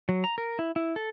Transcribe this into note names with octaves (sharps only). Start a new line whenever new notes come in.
F#3
A#5
A#4
E4
E4
A4